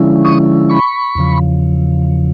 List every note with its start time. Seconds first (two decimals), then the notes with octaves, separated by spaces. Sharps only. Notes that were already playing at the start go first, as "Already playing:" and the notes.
Already playing: D3 F3 G#3 C#4 E4
0.25 C#6 D#6
0.69 B5 C#6
1.15 E2 C#3 F3